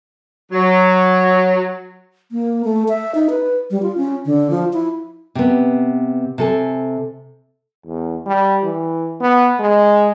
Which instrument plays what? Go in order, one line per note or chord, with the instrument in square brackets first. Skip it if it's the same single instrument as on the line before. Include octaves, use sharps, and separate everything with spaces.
[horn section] F#3
[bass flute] A#3
A3
E5
D#4
B4
G3
F4
C#4
D3
F3
E4
[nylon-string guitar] C3 B3
C3 A4 G#5
[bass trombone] E2
G3
E3
B3
G#3